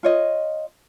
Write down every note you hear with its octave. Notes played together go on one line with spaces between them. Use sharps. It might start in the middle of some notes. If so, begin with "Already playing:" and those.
F4 C#5 D#5